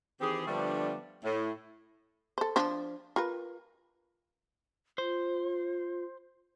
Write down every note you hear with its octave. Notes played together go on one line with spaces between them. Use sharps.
D#3 E3 C4 G4 G#4
D3 F3 G3 A3 B3 D4
A2
A4 C5
F3 D4 C5
F4 A#4 B4
F4 C5